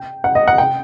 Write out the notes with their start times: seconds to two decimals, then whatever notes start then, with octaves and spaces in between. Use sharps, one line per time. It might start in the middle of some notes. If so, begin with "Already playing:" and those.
Already playing: G5
0.24 F#5
0.35 D#5
0.48 F#5
0.58 G5